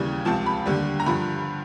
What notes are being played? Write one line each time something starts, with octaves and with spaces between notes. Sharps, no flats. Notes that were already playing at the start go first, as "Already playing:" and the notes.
Already playing: D#2 C#3 E3 G3
C#2 C3 F3 A5
B5
D#2 D3 G3
A#5
G2 D3 F3 B5